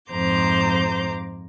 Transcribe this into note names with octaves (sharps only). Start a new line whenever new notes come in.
F2 G#2 C5 A#5 D6 G6